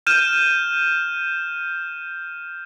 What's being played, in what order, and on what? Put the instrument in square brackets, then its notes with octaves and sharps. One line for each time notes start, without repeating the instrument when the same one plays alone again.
[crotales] F6 G6 D#7 E7